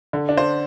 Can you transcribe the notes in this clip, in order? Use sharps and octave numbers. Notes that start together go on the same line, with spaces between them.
D3
D4
C5